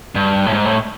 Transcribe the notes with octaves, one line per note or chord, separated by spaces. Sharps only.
G2
A2
G#2
A2